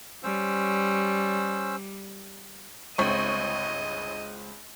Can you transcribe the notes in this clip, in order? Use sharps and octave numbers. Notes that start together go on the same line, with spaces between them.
G3 C#4 C5 E6
G1 C#2 C4 D#5 C#6